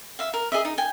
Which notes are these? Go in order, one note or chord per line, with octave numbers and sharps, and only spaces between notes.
E5 F5
A#4
G#4 D#5 E5
D#4
G5 G#5